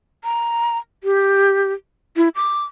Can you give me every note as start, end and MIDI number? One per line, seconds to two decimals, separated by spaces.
0.24 0.78 82
1.04 1.72 67
2.17 2.29 64
2.35 2.65 86